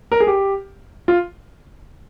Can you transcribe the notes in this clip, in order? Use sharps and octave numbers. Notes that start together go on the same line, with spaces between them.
A#4
G#4
G4
F4